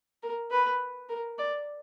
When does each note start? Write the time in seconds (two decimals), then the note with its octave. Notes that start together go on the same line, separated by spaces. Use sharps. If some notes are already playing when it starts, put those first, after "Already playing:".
0.23 A#4
0.51 B4
1.09 A#4
1.38 D5